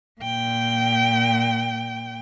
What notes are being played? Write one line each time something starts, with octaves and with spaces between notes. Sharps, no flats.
A#2 G5